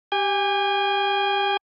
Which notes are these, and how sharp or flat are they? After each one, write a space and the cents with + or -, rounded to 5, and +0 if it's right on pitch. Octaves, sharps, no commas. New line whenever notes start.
G4 +0 G#5 -35